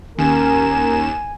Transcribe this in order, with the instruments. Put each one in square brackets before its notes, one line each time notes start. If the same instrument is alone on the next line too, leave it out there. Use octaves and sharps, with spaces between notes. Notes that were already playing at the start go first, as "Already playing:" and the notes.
[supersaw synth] D#2 E7 [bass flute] C#4 [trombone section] A#4 [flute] G#5